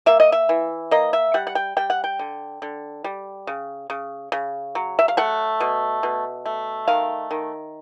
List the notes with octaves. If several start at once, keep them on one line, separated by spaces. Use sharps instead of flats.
A#3 E5
D#5
E5
E3
A#3 D#5
E5
G3 F#5
F#5
G5
G3 G5
F#5
G5
D3
D3
G3
C#3
C#3
C#3
F#3
E5
F5
A3 F#5
B2
B2
A3
D#3 F5
D#3